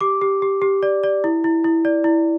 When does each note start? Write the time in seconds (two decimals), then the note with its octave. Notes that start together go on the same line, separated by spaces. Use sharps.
0.01 G4 D6
0.21 G4
0.42 G4
0.62 G4
0.83 D5
1.03 D5
1.24 E4
1.44 E4
1.64 E4
1.85 D5
2.04 E4